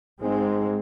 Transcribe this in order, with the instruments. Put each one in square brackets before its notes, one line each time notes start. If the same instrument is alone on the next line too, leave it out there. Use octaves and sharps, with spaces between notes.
[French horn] G#2 [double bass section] G#3 C4